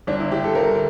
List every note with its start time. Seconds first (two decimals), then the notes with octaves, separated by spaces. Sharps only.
0.07 G1 D4
0.20 E4
0.32 G1 G4
0.44 A4
0.55 G1 A#4